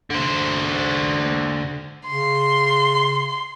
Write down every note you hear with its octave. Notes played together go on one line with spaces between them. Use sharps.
D3 C5
C#3 C6